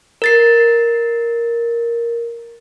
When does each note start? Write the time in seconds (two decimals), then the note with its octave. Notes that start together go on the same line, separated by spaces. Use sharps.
0.22 A#4 A6 C7